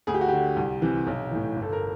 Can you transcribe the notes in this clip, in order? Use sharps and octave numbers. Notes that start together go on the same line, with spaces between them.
D2 G#4
G4
F#4
D3 G4
C2
C3 E3
B1
A2 E3
G1
A4
A#4